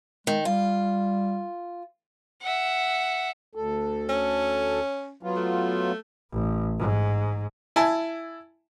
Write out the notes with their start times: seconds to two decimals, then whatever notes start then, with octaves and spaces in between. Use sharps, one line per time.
0.27 D#3 G#3
0.45 G3 F4
2.41 E5 F#5
3.55 D2 A4
4.09 C#4
5.23 F#3 B3 F4
5.36 A3
6.32 A1
6.79 G#2
7.76 E4 G#5 A5